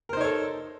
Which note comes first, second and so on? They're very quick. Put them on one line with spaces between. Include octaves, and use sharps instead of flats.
A#4 C5 D#4 C#5 A4